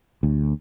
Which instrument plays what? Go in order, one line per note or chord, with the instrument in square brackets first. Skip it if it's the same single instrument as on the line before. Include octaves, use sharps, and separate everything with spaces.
[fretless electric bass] D2